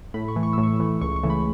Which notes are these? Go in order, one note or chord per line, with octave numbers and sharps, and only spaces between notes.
A2 B5
C#6
E3 A3
C#6
A2 E6
C#6
E3 A3
C#2 C#6
C#6
C#3 E3 A3
B5